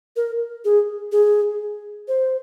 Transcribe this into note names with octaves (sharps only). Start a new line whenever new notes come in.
A#4
G#4
G#4
C5